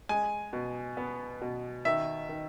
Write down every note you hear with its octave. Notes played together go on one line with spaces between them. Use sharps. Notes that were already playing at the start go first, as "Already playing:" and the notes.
G#3 G#5
B2
B3
B2
D#3 E5
D#3